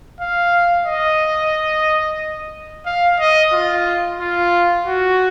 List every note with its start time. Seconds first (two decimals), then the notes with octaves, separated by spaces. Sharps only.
0.20 F5
0.86 D#5
2.86 F5
3.20 D#5
3.52 F4
4.20 F4
4.86 F#4